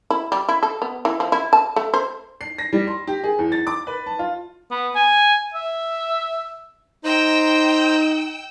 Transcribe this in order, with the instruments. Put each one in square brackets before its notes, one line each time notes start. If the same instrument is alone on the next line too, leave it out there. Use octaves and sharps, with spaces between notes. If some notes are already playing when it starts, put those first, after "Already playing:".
[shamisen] E4
G3
E4
A4
B3
E3
F3
E4
A5
A3
C5
[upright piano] C7
A#6
G3
C6
G4
G#4
E2
A6
D6
B4
A5
F4
[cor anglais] B3
G#5
E5
[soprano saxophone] D#4 [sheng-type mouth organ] C5 A#5 [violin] G5 E6